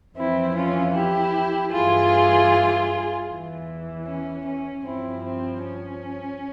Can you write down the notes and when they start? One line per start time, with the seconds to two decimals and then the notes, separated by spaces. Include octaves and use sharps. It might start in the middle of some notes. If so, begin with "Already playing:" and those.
0.16 F2 E3 C4 E4
0.55 C#4 F4
0.94 E4 G4
1.72 G2 E3 F4 G#4
3.29 E2 E3
4.07 C#4
4.46 C#4
4.84 G2 F3 C4 E4
5.24 C4
5.63 C#4